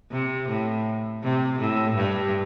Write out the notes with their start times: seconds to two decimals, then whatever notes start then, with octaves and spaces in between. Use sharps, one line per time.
0.12 C3
0.49 A2
1.23 C3
1.59 A2
1.96 G2